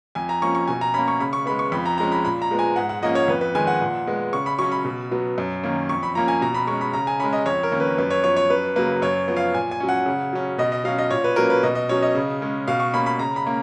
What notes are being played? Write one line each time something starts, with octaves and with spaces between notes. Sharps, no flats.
F2 G#5
A#5
F3 A#3 C#4 C#6
C#6
B2 G#5
A#5
A#3 C#4 B5
C#6
C#3 B5
C#6
G#3 B3 B5
C#6
F2 B5
A#5
F3 G#3 C#4 A#5
B5
A#2 B5
A#5
F3 G#3 B3
G#5
G#2 F#5
F#5
F3 A#3 C#4 D#5
C#5
F2 B4
B4
D#3 G#3 G#5
F#5
A#2
G#3 B3
C#3 C#6
B5
F#3 C#4 C#6
B5
B2
F#3 B3
F#2
D#3 A#3 C#4
F2 C#6
B5
F3 A#3 C#4 A#5
G#5
B2 A#5
B5
G#3 C#4 C#6
B5
C#3 A#5
G#5
G#3 C#4 B5
D#5
F2 C#5
A#4
D#3 A#3 C#4
B4
F#2 B4
C#5
F3 B3 C#5
C#5
F#2 B4
C#3 F#3 A#3 B4
F#2 C#5
F3 B3
F5
A#2 G#5
G#5
F#3 C#4
F#5
C#3
F#3 C#4
B2 D#5
D#5
F#3 C#4 F5
D#5
A#2 C#5
B4
F#3 A#3 C#4 A#4
B4
B2 D#5
D#5
F#3 C#4 C#5
D#5
C#3
G#3 C#4
B2 F5
C#6
A#3 C#4 B5
B5
C#3 A#5
B5
A#3 C#4